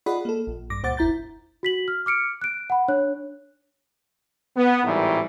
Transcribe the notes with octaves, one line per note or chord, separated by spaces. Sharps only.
F4 G#4 D5 D#5 F#5 B5
A#3 A4
A#1
G2 D6 A#6
C#2 A#2 C5 F#5 D6 A6
G1 D#2 E4 A#5 G6 A6
F#4 B6 F#7
F6
D6 F6 C#7 D7
F#6 D7
F#5 B5
D4 C#5 F#6
B3
G#1 A2 D#3 E3 G3